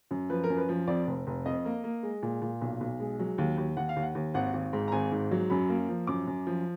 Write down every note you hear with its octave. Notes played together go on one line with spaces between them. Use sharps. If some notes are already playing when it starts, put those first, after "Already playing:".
F#2
F3 B4
A#4
F#2
B4
F3
F2 D5
F1
F1
F2 D#5
A#3
A#3
G#3
A#2
A#2
B1
B1
G#3
F#3
D#2
D#2
D#2 F#5
F5
D#2
F#5
D#2
G#1 F#5
G#1
G#2
A#5
G#1 G#5
G#2
F#3
F#2 B5
A#3
F3
F#2 D6
F#2
F3